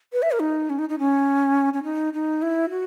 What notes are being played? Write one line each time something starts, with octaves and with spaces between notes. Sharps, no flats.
B4
E5
A#4
D#4
C#4
D#4
D#4
C#4
C#4
D#4
D#4
E4
F#4